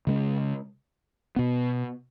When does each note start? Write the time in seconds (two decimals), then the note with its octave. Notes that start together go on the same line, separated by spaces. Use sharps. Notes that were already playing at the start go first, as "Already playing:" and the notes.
0.07 C#3 G#3 C#4
1.36 B2 B3